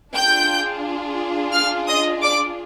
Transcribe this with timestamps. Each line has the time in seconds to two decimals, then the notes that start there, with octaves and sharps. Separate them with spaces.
0.14 D4 F4 G#4 G5 G6
1.53 F5 F6
1.87 D#5 D#6
2.22 D5 D6